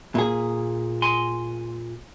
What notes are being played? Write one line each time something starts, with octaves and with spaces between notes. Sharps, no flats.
A#2 G#4
G#5 C6